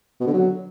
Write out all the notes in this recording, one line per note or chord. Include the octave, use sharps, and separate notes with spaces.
B2
D3
F#3